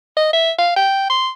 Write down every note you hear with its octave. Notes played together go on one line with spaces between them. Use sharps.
D#5
E5
F5
G5
C6